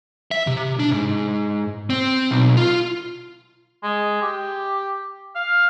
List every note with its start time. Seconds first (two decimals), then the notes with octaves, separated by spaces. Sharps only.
0.31 E5
0.47 C3
0.79 D4
0.92 G#2
1.90 C4
2.31 B1
2.57 F4
3.83 G#3
4.22 G4
5.35 F5